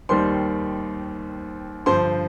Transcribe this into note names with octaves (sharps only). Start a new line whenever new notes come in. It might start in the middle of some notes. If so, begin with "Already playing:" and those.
D#2 D#3 G3 C5 C6
G2 D3 F3 C5 C6